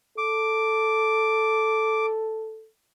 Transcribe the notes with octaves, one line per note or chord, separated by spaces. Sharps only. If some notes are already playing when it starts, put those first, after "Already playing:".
A4 D6